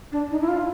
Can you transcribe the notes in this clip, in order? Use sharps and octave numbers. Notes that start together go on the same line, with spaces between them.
D4
D#4
E4
F4